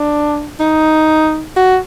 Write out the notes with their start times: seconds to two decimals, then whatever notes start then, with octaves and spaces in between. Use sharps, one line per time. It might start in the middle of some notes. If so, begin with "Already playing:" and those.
Already playing: D4
0.60 D#4
1.56 F#4